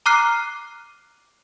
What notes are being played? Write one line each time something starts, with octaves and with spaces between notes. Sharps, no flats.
A#5 D6 F6 F#6 C7